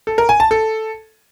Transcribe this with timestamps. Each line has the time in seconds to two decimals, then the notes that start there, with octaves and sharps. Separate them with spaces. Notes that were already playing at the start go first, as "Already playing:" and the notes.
0.07 A4
0.18 A#4
0.29 G#5
0.40 A5
0.51 A4